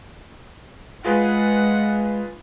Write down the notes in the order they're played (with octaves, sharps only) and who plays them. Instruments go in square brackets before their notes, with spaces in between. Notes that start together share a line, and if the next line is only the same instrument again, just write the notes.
[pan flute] G#3 [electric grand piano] F4 G#4 B4 [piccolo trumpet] F#5